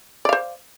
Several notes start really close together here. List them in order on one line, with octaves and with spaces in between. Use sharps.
D5 F5 C5